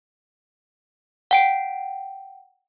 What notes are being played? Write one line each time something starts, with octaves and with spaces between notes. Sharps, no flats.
F#5 G5 D7